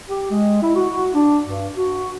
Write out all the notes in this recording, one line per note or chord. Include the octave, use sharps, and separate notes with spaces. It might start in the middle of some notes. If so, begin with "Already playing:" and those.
G4
G#3
E4
F#4
D4
G2
F#4